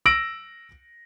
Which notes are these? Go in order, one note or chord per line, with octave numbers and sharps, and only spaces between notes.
E6 A#6 D7 F#7